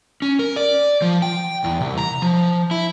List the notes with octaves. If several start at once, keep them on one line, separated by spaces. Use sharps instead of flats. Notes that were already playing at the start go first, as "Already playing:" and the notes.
C#4
A#4
D5
F3
G5
E2
C2
A#5
F3
E4